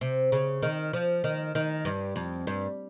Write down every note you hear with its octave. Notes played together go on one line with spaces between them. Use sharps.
C3
C#3
D#3
F3
D#3
D#3
G2
F2
G2